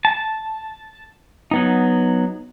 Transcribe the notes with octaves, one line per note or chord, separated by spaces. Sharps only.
A5
F#3 B3 D#4